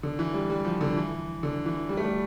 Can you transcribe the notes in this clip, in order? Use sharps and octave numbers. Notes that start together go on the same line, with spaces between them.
D3
E3
G3
G3
F3
D3
E3
D3
E3
G3
A3
G3